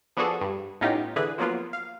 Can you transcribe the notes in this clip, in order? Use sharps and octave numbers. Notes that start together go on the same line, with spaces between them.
F3 B3 D4 F#4 G#4 A4
G2
A2 B3 C#4 D#4 F4 G4
D3 E3 G#4 B4
F3 F#3 A#3 B3 F4
F5